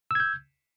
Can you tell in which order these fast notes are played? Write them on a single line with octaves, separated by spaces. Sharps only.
E6 G#6 G6